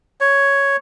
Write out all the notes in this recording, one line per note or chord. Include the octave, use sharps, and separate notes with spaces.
C#5